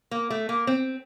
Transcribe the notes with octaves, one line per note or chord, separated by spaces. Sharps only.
A#3
A3
A#3
C4